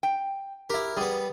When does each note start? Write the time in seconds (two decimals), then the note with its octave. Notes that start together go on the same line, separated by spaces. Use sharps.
0.03 G5
0.70 E4 G4 A#4
0.97 G3 B3 G#4